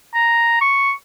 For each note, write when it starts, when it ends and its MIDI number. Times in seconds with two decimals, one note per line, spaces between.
0.15 0.59 82
0.61 0.93 85